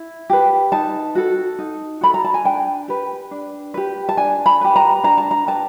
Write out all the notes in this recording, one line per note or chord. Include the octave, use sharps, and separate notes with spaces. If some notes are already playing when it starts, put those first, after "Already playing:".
Already playing: E4
G4 B4
D#4 A5
F#4 A4
D#4
F#4 A4 B5
A#5
A5
G#5
D4 G5
G4 B4
D4
G4 B4
A5
D4 G#5
B5
G4 B4
A#5
D4 A#5
A5
A#5
G4 B4 A5